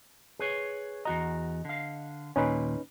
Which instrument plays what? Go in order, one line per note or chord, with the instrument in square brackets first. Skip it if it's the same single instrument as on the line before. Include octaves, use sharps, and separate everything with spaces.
[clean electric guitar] G#4 B4 C#5
[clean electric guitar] E2 F#4 A#5 [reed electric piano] D#5
[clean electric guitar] D3 F5
[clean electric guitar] D#2 A#2 [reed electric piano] C#4 D#4 B4